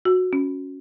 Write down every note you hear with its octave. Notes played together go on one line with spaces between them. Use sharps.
F#4
C#4